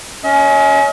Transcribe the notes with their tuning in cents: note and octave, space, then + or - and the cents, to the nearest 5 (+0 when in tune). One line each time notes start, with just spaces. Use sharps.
C#4 +20 D#5 +45